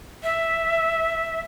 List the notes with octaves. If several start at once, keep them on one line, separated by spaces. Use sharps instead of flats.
E5